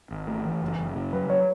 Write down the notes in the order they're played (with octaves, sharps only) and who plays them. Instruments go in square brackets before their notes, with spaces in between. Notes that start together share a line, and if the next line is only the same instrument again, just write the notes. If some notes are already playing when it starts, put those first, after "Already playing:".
[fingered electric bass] G#1
A3
E3
F#1
F#1
C#3
[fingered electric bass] F#3 [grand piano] B4
[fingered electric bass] F#3 [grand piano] C#5